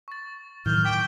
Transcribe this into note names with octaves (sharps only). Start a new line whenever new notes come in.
C#6 A6
A2 D#3 F#3 F6 G6
G5 C#6 D6 B6